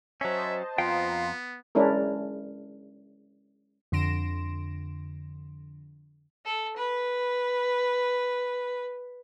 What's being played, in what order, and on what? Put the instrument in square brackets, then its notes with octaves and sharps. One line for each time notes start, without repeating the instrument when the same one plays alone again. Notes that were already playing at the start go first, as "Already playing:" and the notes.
[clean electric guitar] F#3 C#4 [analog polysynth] C5 D#5 A5 [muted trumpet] E5
[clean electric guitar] F2 F5 G5 [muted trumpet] B3 [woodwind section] F4 A#5 C6
[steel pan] G#3 C#4 D4 E4 A#4
[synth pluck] F2 D3 C6 A#6 D7 E7
[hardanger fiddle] A4
B4